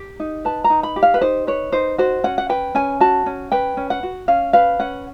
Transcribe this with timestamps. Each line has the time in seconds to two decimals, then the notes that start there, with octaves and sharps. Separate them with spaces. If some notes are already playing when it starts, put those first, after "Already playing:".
Already playing: G4
0.20 D#4
0.45 B4 A5
0.64 A#5
0.70 D#4
0.83 B5
0.96 G4
1.03 F5
1.14 B4
1.22 D#4 C5
1.47 B4 C#5
1.72 D#4 C5
1.98 F#4 C5
2.24 C#4 F#5
2.38 F#5
2.49 B4 G5
2.75 C#4 G#5
3.00 F#4 A5
3.26 C#4
3.52 B4 G5
3.77 C#4
3.90 F#5
4.03 F#4
4.28 C#4 F5
4.53 B4 F5
4.80 C#4 F#5